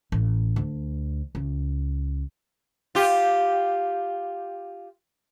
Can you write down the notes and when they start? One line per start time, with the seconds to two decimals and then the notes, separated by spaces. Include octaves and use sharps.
0.12 A1
0.56 D2
1.35 C#2
2.95 F4 G4